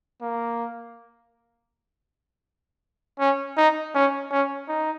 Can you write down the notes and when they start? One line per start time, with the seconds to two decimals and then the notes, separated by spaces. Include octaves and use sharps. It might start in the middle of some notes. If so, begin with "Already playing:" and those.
0.22 A#3
3.19 C#4
3.57 D#4
3.94 C#4
4.31 C#4
4.68 D#4